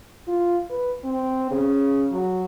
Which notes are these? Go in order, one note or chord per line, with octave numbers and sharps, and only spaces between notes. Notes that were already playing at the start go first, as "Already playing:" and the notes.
F4
B4
C4
C#3
F#3